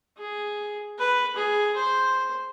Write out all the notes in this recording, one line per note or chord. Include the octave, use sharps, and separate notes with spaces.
G#4
B4
G#4
C5